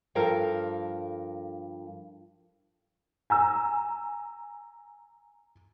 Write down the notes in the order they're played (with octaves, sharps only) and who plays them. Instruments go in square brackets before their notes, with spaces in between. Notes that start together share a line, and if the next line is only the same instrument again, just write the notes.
[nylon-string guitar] G2 F3 A4 A#4 F5
[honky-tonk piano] G#5 A#5 E6